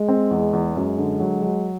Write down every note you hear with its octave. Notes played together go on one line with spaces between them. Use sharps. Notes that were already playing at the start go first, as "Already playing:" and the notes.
Already playing: G#3
C4
E2
E2
F#2 G#3
D3
F#3
F#3